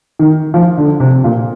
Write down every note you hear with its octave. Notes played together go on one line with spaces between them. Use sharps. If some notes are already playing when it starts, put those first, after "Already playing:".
D#3
F3
D3
C3
A#2